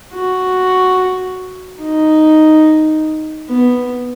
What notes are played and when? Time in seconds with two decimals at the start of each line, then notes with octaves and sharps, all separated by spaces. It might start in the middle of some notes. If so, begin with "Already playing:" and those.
0.12 F#4
1.81 D#4
3.48 B3